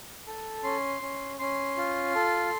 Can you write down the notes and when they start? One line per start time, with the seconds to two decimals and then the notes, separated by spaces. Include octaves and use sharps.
0.27 A4
0.64 C#4 C6
1.01 C#4
1.39 C#4 C6
1.77 F4
2.15 A4